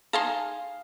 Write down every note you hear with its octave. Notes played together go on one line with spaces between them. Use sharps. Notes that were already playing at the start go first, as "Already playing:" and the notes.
D#4 G#4 F5 A5 A#5 C6